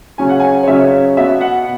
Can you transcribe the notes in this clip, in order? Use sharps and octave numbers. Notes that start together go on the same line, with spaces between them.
C#3 F#3 C#4 G#5
F#5
G#5
C#5
C#3 F#3 C#4 E5
B2 B3 E5
F#5